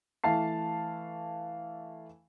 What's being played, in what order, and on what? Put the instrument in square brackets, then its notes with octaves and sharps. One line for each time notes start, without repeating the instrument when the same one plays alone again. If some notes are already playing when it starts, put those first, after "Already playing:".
[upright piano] E3 A3 F5 A5 C7